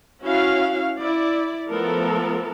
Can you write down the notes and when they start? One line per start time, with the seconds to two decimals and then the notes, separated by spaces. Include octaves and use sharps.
0.23 C#4 E4 F#4 F5
1.00 E4 D5
1.69 F3 A3 B3 A4 A#4